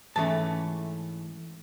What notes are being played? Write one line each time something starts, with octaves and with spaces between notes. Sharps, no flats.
G#2 E3 A3 C#4 A5